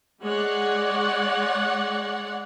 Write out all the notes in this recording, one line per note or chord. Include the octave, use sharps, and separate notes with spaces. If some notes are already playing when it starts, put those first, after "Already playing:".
G#3 C#5 D5 F#5